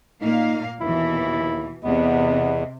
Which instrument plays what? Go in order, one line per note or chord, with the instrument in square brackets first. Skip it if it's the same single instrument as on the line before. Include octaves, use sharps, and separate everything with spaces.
[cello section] A#2 A#3 F5 [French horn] D#4
[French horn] D#2 [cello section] B2 E3 [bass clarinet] E4
[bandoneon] E2 [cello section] C3 [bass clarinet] B3 [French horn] D#5